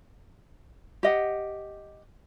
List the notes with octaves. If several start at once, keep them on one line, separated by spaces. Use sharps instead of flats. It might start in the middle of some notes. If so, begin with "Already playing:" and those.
G4 D#5 F#5